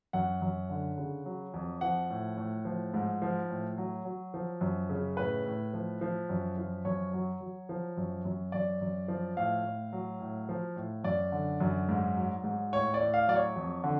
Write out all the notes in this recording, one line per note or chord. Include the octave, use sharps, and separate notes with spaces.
F#2 F#5
F#2
D3
C#3
F#3
F2
F3 F#5
A2
A2
F3
G#2
F3
A2
F#3
F#3
F3
F#2
C#3
A2 B4
A2
F3
F3
F#2
F3
F#2 C#5
F#3
F#3
F3
F#2
F#2
F#2 D5
F#2
F3
A2 F5
A2
F#3
A2
F3
A2
F#2 D5
D3
F#2
G#2
F#3
G#2
A2 C#5
D5
A2
F5
F#3 D5
C#5
F2
D3